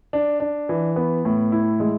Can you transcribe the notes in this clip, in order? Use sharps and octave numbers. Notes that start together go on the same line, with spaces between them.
D4
D4
E3
B3
A2
E4
G#3